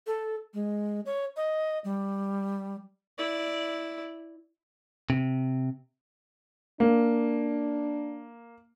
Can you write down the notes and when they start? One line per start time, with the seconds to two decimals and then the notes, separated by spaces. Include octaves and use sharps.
0.07 A4
0.54 G#3
1.06 C#5
1.37 D#5
1.84 G3
3.18 E4 D5
5.10 C3
6.80 A#3 D4